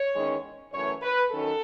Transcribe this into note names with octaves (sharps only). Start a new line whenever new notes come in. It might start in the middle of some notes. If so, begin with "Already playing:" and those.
Already playing: C#5
E2 D#3 G#3 C#4
F#2 E3 A3 C#5
B4
D#3 F#3 C#4 A4